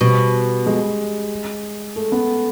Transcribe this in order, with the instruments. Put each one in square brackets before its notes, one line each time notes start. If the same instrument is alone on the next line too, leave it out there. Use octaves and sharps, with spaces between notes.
[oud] B2 [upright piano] G3
[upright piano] G#3
A3
B3